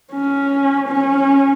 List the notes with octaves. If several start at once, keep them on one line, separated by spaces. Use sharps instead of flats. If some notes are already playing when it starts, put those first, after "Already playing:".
C#4
C#4